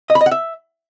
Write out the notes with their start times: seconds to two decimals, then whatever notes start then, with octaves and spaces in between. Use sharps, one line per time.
0.10 D#5
0.15 B5
0.21 D#5
0.26 F#5
0.31 E5